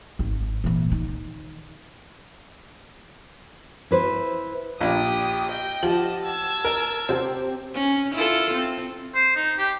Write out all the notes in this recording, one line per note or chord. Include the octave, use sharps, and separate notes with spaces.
G#1
A#2 E3
D#3
E4 B4 C5
A#1 D4 G4 D#6
D#5 G5
F3 G4 D#5 F#5 A5 F#7
A5 E6 G#6
A#4
C3 C4 G4 C5
C#4
E4 F4 A4
C4
C5
D#4
G4